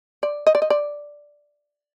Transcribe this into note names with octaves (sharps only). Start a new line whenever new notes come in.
D5
D#5
D5
D#5
D5